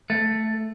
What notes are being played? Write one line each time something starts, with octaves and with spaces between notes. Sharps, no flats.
A3